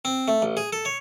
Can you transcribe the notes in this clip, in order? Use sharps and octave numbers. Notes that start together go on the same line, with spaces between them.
C4
A3
A1
G#4
A4
C#5